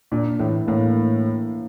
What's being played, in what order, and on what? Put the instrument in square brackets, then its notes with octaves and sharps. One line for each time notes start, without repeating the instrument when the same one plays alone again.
[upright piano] A#2 [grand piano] D4
[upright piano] A2 [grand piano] E3
[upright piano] A2 [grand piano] A#3